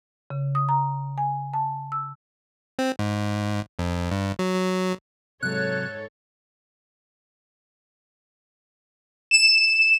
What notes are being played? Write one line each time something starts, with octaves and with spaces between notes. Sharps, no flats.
C#3
D#6
A#5
G#5
A5
E6
C4
G#2
F2
G2
F#3
F#3
G#2 C3 F#3 A4 C#5 F#6
E7